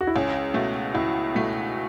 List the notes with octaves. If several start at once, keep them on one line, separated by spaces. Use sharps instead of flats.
F#4
E4
C#2 C#4
B2 A3
C#2 E4
B2 A3